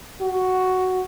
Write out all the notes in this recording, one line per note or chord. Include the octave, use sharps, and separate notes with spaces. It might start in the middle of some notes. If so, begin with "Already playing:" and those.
F#4